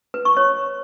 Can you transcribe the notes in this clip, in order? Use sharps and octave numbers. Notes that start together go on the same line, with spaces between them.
B4
C#6
C#5